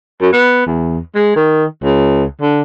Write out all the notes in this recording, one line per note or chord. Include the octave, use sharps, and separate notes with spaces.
F#2
B3
E2
G#3
D#3
C#2
D3